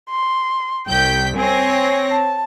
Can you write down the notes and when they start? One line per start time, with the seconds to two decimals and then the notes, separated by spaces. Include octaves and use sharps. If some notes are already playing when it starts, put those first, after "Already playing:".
0.10 C6
0.87 C2 G5 G6 B6
1.37 C4 C#5 G#5 A#6
2.10 A5